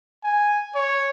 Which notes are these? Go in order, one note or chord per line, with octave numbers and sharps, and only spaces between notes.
G#5
C#5